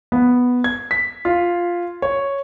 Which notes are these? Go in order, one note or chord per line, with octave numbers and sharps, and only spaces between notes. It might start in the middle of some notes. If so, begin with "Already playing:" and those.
B3
G#6
B6
F4
C#5